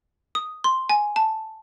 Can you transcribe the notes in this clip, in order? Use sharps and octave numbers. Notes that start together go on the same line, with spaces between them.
D#6
C6
G#5
A5